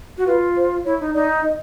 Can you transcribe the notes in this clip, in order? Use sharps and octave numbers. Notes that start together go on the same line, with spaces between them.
F#4
F4 B4
C5
E4 C#5
D#4
D#4 D5
D#5